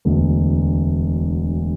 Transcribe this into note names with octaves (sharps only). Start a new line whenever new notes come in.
E1 D2 D3